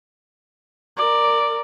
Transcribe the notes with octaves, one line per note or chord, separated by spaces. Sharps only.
A#4 D5